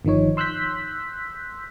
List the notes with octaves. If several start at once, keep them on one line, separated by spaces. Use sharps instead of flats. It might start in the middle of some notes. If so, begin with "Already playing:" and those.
G1 D#3 F3 D#4 C#5
C6 E6 F#6 G6 B6